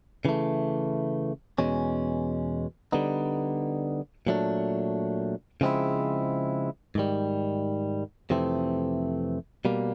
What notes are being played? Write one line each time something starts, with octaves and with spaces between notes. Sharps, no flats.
C#3 E3 A3
E2 B2 G#3 C#4
D3 G3 B3 D#4
A#2 F#3 A3 D4
C#3 F3 G#3 C4 E4
G#2 D#3 G3
F2 C3 E3 A3 C4
B2 G3 A#3